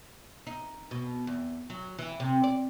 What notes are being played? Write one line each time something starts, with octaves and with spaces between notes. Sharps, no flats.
D#4
B2
E2
F#3
E3
C3
D5